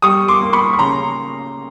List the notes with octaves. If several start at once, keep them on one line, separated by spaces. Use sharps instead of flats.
G3 C#6 D#6
C6 D6
A#3
B5 C#6
C#6
C#3 A#5 C6